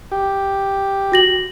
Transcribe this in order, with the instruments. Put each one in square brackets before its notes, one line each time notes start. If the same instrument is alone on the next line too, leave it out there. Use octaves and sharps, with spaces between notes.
[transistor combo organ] G4
[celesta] F#4 A#6 F#7